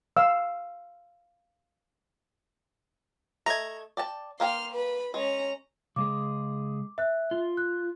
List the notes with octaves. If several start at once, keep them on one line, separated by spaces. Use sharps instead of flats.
F5 E6
A3 D#5 A#5 G#6
D5 G5 A5
A#3 F5 G5 C6 F6
B4 B5
G#3 C#4 A#5
C#3 G#3 G#4 D6
E5 F#6
F4
F#6